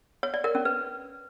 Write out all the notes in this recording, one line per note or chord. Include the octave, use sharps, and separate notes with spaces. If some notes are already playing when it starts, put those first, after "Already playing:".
C#5
D5
A#4
C#4
B4